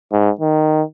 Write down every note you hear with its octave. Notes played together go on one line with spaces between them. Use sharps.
G#2
D#3